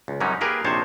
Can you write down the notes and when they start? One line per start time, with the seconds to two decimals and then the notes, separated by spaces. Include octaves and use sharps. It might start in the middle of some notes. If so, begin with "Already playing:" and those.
0.08 C#2
0.20 F#2 C3 F#3 G3 C#4 D#4
0.41 A#3 G4 G#4 A#4 B4
0.64 A#1 C3 D#4 C5 C#5 A5